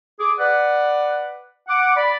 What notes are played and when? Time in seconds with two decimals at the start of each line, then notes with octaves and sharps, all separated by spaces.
0.20 G#4 D6
0.39 B4 D5 F#5
1.68 F#5 D6
1.95 D5 B5